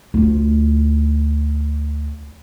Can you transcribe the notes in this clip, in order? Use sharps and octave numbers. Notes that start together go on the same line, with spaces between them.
D2 F4